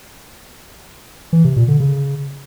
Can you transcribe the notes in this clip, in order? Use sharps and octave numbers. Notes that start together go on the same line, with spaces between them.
E3
C3
A#2
D3
C#3